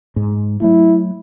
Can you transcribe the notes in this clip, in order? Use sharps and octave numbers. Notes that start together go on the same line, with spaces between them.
G#2 G#3
F#3 A3 E4